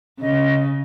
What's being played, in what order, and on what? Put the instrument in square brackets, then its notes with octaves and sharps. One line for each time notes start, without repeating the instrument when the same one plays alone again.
[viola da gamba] C#3 [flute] D#5